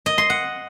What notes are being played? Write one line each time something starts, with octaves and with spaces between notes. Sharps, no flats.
D#5
C6
F#5